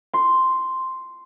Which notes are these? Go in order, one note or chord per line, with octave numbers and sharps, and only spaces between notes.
C6